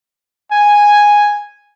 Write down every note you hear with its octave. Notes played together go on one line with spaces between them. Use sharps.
G#5